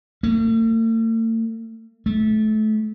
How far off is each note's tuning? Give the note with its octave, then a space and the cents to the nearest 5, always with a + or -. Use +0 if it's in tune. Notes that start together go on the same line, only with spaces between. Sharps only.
A3 +45
A3 -25